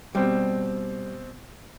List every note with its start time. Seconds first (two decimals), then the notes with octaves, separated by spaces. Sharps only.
0.15 B2 G3 C4